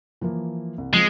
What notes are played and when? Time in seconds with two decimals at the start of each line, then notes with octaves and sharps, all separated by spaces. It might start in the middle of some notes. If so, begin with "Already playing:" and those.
0.21 E3 F3 A#3
0.78 C2
0.93 F3 G#3 C4